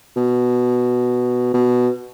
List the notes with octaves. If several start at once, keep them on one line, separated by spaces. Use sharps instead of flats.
B2
B2